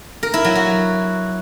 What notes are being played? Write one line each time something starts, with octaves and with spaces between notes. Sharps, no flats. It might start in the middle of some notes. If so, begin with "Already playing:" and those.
A#4
E4
F#3
F#4